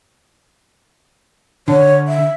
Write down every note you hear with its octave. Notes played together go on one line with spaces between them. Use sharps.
D3 C#5
E5